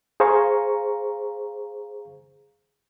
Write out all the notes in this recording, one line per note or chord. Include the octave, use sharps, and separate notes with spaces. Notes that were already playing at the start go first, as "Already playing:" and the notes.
G#4 C5 F5 A#5 C#6